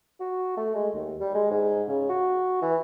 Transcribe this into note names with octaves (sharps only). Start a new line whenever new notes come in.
F#4
A3
G#3
D#2
G3
G#3
G#2
C#3
F#4
E3